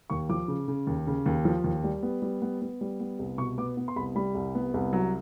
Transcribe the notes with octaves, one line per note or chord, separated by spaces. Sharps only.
D#2 C#6
F3 D6
C#3
C#3
D#2
C#3
D#2
F3
D#2
G3
B3
G3
B3
B3
G3
B3
C2
B2 C#6
B3 D6
B3
C6
C2 B5
G3 B5
C2
B3
C2
F#3